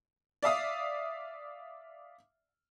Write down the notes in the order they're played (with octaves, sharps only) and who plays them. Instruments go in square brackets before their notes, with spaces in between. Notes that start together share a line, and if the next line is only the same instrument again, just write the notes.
[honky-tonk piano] D5 E5 F5 D#6